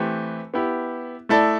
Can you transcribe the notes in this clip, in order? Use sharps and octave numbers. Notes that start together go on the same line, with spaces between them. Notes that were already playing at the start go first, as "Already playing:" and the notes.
Already playing: E3 A3 C4 G4 B4
B3 E4 G4
A3 E4 A4 D5